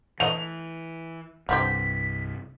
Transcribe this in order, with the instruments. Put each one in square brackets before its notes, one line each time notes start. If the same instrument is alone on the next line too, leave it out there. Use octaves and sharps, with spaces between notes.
[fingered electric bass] E3 [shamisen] A3 D#5 [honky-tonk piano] F7
[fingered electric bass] C2 G2 [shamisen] D3 C4 G4 [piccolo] B6